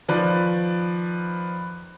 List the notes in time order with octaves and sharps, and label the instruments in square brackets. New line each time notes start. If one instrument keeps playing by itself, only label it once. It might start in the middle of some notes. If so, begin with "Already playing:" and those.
[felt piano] D#3 F3 B4 D5